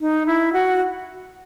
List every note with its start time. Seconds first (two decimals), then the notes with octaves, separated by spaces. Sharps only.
0.01 D#4
0.26 E4
0.53 F#4